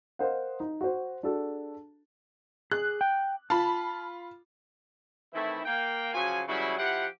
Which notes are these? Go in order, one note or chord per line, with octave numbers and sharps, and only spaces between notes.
A#4 C5 D#5 F5 F#5
D#4
F#4 C5
D4 F#4 G#4 A4
G#4 F#6
G5
F4 A5 B5
D#3 E3 A3 C4 E4
A#3 G5
C#3 F3 F#3 F#4 G#5
C#3 E3 F#3 G3 E4
F3 E4 G4 F#5